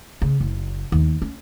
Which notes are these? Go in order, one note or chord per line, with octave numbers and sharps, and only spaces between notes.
C#3
F#1
D#2
C#4